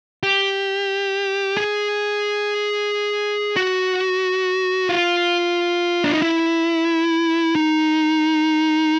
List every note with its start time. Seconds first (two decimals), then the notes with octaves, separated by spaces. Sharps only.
0.23 G4
1.57 G#4
3.56 F#4
4.89 F4
6.04 D4
6.14 D#4
6.22 E4
7.55 D#4